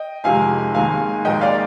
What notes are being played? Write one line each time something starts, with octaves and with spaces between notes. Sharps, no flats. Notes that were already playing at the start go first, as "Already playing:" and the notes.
Already playing: D#5 G5
F2 C3 D#3 G#3 F5 G#5
D#2 D#3 G#3 F5 G#5
D#2 D#3 G#3 D#5 G5
D5 F5